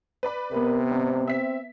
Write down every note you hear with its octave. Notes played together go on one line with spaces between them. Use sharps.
B4 D5 B5
C3 B3 A#4
G#1 C4
C4 E5 B6